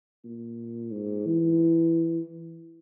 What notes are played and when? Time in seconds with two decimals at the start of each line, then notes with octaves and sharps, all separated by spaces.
0.24 A#2
0.92 G#2
1.26 E3